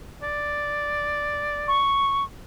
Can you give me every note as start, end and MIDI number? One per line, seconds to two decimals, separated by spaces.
0.23 1.79 74
1.68 2.24 85